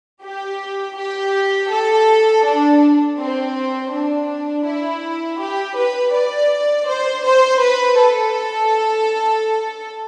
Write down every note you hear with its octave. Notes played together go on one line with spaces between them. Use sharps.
G4
G4
A4
D4
C4
D4
E4
G4
B4
D5
C5
C5
B4
A4